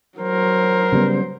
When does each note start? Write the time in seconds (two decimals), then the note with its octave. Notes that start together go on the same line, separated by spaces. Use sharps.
0.19 F#3 A#4 C5
0.92 C#3 G3 B3